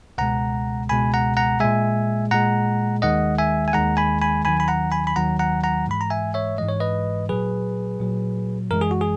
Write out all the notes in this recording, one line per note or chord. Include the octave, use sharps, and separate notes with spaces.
C#2 B2 G#3 F#5 A#5
C#2 B2 G#3 G#5 B5
F#5 A#5
F#5 A#5
A#2 G#3 E5 G#5
A#2 G#3 F#5 A#5
D#2 D#3 G#3 D#5 F#5
E5 G#5
G#5
D#2 D#3 G#3 F#5 A#5
G#5 B5
G#5 B5
D#2 D#3 F#3 G#5 B5
B5
F#5 A#5
G#5 B5
B5
D#2 D#3 F#3 F#5 A#5
F#5 A#5
F#5 A#5
G#2 E3 G#3 B5
A#5
E5 G#5
C#5 E5
G#2 E3 G#3 D#5
C#5
B4 D#5
A#2 F#3 G#4 B4
A#2 F#3
F#2 E3 G#3 A#4
G#4
F#4
G#4